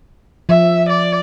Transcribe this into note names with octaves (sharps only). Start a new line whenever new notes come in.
F3 E5
D5